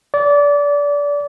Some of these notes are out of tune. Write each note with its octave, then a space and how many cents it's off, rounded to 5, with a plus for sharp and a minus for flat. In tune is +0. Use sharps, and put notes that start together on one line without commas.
D5 -25